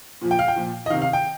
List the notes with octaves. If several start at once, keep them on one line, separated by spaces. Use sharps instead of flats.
A#2 F3
G5
F5
G5
A#2 F3
D#5
C3 D#3 F5
F5
G5